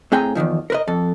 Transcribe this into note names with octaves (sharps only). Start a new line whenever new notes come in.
A2 C4 G#4 G5 G#5 A#5
E2 A#2 D#3 F3
A#4 B4 D#5
F2 A4